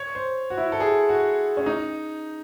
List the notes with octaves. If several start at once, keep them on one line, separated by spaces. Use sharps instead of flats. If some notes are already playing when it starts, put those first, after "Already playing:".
Already playing: C#5
C5
F#4
E4
A4
G#4
F#4
C#4
D#4